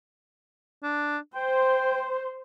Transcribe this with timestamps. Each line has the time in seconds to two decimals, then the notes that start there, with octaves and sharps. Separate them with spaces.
0.83 D4
1.35 C5 G5